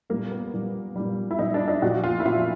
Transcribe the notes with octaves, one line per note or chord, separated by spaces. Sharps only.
A#2 G3 A#3
B3
A#2 G3
A#2 G3
E4
A#2 G3 D#4
D4
D#4
A#2 F3 F#4
F4
E4
A#2 F3 F4